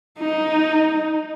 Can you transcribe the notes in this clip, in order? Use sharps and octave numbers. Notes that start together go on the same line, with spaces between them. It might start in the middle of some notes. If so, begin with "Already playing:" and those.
D#4